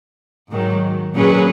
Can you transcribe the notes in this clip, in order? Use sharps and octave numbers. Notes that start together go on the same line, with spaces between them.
G#2 D#3 F#3
A#2 F#3 C#4 G#4 B4